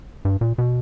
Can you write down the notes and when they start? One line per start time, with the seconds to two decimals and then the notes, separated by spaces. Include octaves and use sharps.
0.25 G2
0.41 A#2
0.58 B2